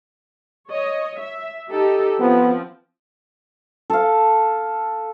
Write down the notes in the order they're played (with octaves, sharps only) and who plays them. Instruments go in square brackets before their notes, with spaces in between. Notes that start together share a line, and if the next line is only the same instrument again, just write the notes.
[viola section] C#5 D#5
E5
D#4 G4 A4
[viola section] F3 C4 [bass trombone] B3
[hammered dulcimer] A4 F5